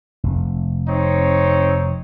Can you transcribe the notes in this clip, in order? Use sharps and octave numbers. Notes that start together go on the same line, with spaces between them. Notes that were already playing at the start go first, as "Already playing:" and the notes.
F1
C4 D#4 C#5